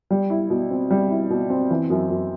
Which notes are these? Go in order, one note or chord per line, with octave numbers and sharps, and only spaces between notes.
G3
E4
B2
C4
G3
E4
B2
C4
E3
F#2
F#2